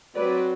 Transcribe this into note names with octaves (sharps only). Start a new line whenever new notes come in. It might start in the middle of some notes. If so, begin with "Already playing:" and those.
F#3 C4 B4 D5